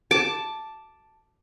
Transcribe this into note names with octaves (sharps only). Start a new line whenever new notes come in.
A5 D6